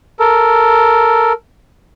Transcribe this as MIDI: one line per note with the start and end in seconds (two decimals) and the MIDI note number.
0.20 1.33 69
0.20 1.33 70